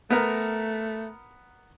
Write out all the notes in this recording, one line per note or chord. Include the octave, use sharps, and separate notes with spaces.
A3 B3 A#4